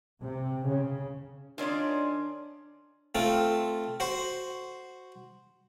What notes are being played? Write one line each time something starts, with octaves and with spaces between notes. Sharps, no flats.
C3
C#3
D#3 C#4 D4 F4 D5 C6
A3 C4 F4
F#4 C5